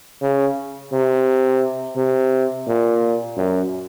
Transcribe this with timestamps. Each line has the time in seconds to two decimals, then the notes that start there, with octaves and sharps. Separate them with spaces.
0.22 C#3
0.93 C3
1.97 C3
2.68 A#2
3.37 F#2